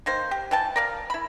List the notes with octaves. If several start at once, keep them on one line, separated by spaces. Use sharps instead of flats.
D#3 A#3 C5
G4
E3 G5 A5
A#4 D5 F5
E4 B5